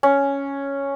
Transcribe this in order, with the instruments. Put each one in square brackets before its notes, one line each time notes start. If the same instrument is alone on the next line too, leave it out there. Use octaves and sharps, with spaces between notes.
[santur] C#4